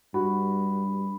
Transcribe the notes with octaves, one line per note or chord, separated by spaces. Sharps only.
G2 F#4 B5